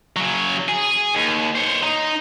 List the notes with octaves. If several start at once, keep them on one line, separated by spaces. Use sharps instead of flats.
C#3 F#3
G#4
D#2
C5 C#5
D#4